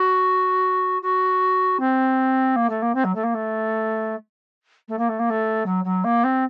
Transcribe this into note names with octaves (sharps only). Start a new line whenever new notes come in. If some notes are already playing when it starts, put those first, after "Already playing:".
Already playing: F#4
F#4
C4
A#3
A3
A#3
C4
F#3
A3
A#3
A3
A3
A#3
A3
A#3
A3
F#3
F#3
A#3
C4